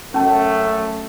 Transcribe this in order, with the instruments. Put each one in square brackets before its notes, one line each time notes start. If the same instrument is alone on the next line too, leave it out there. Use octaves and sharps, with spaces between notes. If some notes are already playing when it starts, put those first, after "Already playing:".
[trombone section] F#2 A3 [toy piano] C#4 A5